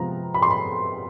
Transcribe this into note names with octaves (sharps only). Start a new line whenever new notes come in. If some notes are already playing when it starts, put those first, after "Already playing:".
Already playing: C3 F3 G#3 B3 A#5
B5
C6
B5